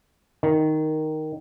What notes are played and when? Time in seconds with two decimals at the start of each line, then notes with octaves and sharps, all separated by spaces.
0.43 D#3